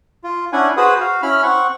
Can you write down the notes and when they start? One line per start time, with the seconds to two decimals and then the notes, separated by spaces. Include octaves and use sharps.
0.24 F4
0.53 C#4 D4 E4 F#5 G#5
0.77 F#4 G#4 B4 C5 F#5 D#6
1.01 F#4 F5
1.22 C#4 E4 B5 F6
1.43 C4 F#5 C#6